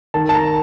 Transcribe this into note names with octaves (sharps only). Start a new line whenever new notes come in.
D#3 A5
A5
A#5